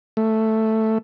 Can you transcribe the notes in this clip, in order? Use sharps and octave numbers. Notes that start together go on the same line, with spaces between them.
A3